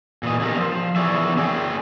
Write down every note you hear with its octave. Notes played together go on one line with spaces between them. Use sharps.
A#2 E3 D#5
B2 D3 D#3 D#4 G4 A#4
F3
E3 B3 G#4 C#5 D5 E5
C#4 G#4 G5